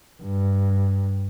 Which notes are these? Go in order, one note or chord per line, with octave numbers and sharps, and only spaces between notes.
G2